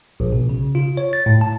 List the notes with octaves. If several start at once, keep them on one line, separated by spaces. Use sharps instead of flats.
A#1
B2
C#3
F4
C#5
A6
A2
A5